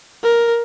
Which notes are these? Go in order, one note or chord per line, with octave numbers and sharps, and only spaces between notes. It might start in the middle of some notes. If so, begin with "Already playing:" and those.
A#4